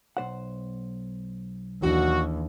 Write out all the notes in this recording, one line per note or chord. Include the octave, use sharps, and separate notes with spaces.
B1 C5 F#5
D#2 E3 D4 F#4